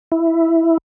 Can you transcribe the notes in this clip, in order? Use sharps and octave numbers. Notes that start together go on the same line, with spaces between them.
E4